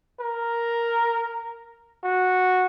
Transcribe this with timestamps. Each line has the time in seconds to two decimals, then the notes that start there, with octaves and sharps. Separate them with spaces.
0.20 A#4
2.03 F#4